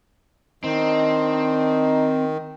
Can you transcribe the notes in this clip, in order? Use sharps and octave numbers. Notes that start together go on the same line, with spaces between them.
D#3 C4 D4 D#4